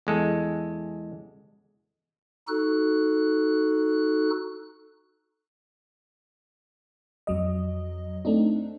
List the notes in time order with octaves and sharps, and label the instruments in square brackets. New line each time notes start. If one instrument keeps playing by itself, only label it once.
[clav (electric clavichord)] E2 G#3 A4
[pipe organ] D#4 F#4 A4 F#6
[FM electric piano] F2 F#3 D#5
A3 C4 D4 D#4